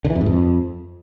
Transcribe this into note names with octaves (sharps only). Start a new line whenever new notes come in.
D3
E3
F2
G#2
F2